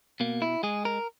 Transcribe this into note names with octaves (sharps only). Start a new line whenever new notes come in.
B2 A#3
E4
G#3 G#4
A#4